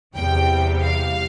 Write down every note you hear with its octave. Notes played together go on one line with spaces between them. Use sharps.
E2 C3 G3 G5
F5